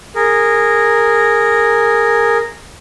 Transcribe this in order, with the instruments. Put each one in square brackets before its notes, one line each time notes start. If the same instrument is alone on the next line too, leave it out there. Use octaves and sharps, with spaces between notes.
[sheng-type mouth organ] G#4 A#4